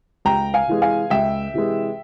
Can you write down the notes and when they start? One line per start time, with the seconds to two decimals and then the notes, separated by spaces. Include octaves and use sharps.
0.25 C#2 G5 A#5
0.54 F5 G#5
0.68 C3 E3 G#3
0.82 F5 G#5
1.10 C#2 E5 G5
1.54 C3 E3 G#3